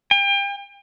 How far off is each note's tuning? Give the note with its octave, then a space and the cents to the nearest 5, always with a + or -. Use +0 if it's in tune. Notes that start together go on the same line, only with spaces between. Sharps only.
G5 +35